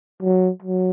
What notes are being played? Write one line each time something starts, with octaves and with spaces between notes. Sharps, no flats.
F#3
F#3